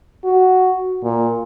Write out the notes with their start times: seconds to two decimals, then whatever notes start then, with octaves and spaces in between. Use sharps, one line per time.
0.24 F#4
1.04 A#2